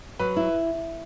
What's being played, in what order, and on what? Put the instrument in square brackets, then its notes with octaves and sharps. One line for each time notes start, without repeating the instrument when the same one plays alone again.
[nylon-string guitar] F#3 [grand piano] B4
[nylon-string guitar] E4